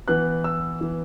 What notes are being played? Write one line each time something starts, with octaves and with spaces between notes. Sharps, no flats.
E3 B3 F#6
E6
E3 B3